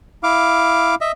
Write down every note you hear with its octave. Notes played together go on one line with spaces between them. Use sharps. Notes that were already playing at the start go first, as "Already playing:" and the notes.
E4 F5 D6
D#5 E5